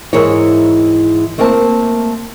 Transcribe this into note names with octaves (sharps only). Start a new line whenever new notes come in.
G#2 E3 E4 G#4 A#4 C#5
A3 A#3 C4 A#4 A5